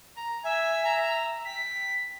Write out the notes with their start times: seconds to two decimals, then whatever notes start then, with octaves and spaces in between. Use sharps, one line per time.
0.17 A#5
0.44 E5 G#5
0.85 A#5
1.45 G5 B6